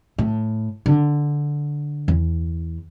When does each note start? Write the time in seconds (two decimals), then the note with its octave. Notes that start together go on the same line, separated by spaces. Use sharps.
0.18 A2
0.86 D3
2.08 E2